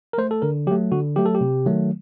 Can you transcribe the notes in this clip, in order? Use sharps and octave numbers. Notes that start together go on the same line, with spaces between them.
A#4
A3 C5
A4
D3 A#4
F#3 A3 G4
D3 F#4
F#3 A3 G4
A4
G4
C3
D#3 F#3 A3